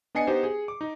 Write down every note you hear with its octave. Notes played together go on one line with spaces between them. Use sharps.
B3 D4 D#5 G#5 C7 C#7
B3 D#4 G4 B4 C5
G#4
D6
D#4